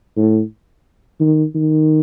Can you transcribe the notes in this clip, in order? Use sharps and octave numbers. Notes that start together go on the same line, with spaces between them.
A2
D#3
D#3